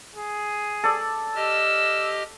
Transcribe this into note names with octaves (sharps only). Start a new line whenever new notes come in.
G#4
A4 D5
G4 D#5 E6 F6